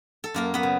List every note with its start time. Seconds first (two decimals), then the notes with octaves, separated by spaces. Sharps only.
0.24 A4
0.34 F#2 A#3 A#4
0.54 B3 B4
0.63 C#3